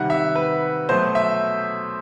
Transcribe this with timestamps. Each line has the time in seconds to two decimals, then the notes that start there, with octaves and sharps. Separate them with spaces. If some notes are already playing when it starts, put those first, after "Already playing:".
Already playing: C3 D#3 G3 F#5
0.10 E5
0.35 B4
0.89 B2 F#3 A3 C5
1.15 E5